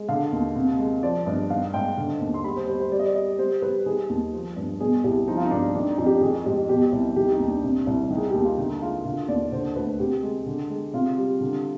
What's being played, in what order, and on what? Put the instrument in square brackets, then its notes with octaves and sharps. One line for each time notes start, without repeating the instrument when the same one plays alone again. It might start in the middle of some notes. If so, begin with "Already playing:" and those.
Already playing: [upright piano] G#3
D3 F5
D#2
C3
G#3
F3 D5
G2 D#5
D#3 F5
G#2 G5
D3
D#2
C6
G3 B5
C5
G3 C5
C5
G3 D5
D#5
D5
G3 D#5
G3 C5
G3 B4
D#3 G#4
D#2
F3
G2
B2 G#4
C2 G4
F3 D#4
F4
D#4
G2 D4
D#3 D4
D#4
F2
G4
D#3 G#4
G#2 G4
B2 G4
C2
D#3 G4
D#4
D#2
D4
C3
C2
D#3
G#4
D#2 G4
F4
D3 D#4
G#3 F4
D3 F4
D#2 D5
D3 C5
D2 B4
C3 G4
G#3
D3
G#3
C3 F4
G3
D3